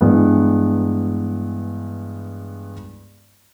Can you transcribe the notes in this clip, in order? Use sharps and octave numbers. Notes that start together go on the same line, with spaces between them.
G2 E3 G#3 B3